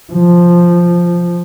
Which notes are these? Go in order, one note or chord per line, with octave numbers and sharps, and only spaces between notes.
F3